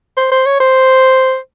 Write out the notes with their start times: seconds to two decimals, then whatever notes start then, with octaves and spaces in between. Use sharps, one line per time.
0.17 C5
0.32 C5
0.46 C#5
0.60 C5